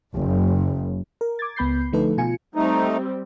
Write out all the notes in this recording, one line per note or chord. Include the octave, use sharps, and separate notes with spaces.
F#1
A#4
D6 G#6 A6
C#2 B3 B5 G6 C7
D3 F3 A3 D#4 A4 B4
B2 F4 G#5 C#7
G3 A3 C4 D#4